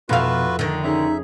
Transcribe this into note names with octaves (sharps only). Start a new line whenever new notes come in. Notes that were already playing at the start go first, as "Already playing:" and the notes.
F1 B2 F4 F#4 B4 E5 F5
D3 D#3
C#4 D#4 G#4 D#5 E5